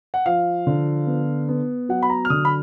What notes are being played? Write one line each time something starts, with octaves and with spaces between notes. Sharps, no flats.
F#5
F3 F5
D3
B3
B3
F#3 F#5
B5
A#5
F6
D3 D#6
B5